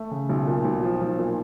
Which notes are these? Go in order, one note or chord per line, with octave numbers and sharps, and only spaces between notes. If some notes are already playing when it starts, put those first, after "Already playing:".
Already playing: A3
C#3
B1
A#2
B1
F3
B1
A#2